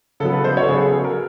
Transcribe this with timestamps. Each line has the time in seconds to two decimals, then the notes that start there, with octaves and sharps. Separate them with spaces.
0.20 C#3 F#3 B3 A4
0.33 B4
0.44 C5
0.57 C#5
0.62 A4
0.68 C#3 F#3 B3 G#4
0.81 G#4
0.92 A4
1.04 A#4